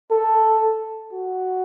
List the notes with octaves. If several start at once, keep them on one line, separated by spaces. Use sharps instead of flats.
A4
F#4